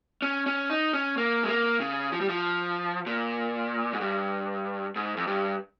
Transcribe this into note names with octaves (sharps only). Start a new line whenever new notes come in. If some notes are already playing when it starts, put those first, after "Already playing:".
C#4
C#4
D#4
C#4
A#3
G#3
A#3
C#3
F3
G3
F3
A#2
G#2
G2
G#2
F2
G2